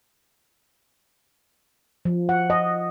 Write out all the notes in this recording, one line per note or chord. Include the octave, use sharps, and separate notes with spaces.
F3
F#5
D#5